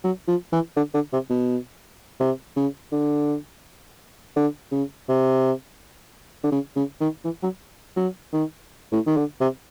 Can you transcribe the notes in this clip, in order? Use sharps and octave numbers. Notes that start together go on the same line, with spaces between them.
F#3
F3
E3
D3
D3
C3
B2
C3
C#3
D3
D3
C#3
C3
D3
C#3
C#3
D#3
E3
F#3
F#3
D#3
A2
D#3
D3
C3